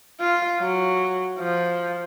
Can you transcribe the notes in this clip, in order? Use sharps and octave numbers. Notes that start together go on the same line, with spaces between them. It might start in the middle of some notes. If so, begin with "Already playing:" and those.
F4
F#3
F3